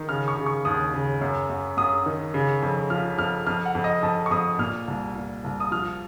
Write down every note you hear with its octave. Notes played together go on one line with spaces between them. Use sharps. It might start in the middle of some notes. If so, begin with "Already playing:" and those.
Already playing: D#3
C#3 F6
C#6
C#3
C#6
D#2 D#6
C#3
F#2
F#2
F#2 D#6
D#3
C#3
F2
F3 F6
F2 F6
F2 F6
F#5
F2
D#5
F2 A5
C#6
F2 D#6
A#2 F6
C2
A#2
C2
D#6
F3 F6